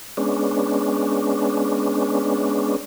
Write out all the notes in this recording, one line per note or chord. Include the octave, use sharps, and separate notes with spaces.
G#3 B3 C#4 D4